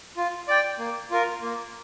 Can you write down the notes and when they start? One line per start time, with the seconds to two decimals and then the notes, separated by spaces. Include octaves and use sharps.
0.17 F4
0.48 D5 G5
0.78 A#3
1.11 F4 A#4
1.42 A#3